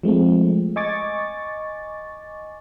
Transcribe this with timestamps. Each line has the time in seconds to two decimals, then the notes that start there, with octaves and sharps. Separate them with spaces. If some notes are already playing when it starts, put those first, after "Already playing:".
0.03 F3 G#3 A3 C4
0.76 D#5 G#5 C#6 D6 A6